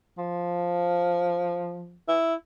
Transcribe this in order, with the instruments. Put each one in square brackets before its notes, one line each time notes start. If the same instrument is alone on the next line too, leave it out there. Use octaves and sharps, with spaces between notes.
[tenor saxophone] F3
E4